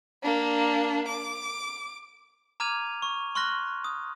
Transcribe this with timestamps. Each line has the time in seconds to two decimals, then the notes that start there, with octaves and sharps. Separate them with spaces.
0.23 A#3 D4
1.08 D6
2.60 A#5 D6 F6 G#6 D#7 F7
3.02 C#6
3.35 C6 C#6 F6 F#6 A#6
3.84 D#6